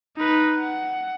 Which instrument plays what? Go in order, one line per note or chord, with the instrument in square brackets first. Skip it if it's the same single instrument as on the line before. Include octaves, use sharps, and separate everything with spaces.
[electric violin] D#4 B4
F#5